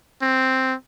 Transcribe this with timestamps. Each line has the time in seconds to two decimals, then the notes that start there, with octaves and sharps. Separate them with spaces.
0.22 C4